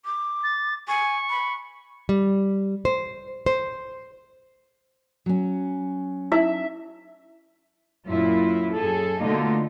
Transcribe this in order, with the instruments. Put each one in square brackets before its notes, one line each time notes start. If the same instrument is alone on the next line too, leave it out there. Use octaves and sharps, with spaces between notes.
[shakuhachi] D6
[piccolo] A6
[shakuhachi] G#5 [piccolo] C#6
[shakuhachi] B5
[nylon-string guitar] G3
C5
C5
[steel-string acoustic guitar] F#3 C#4
[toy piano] D#4 E4 [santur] E5
[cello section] F#2 A#2 E4 F4
F#2 G#4 A4
B2 D3 A3 A#3 D#4 F4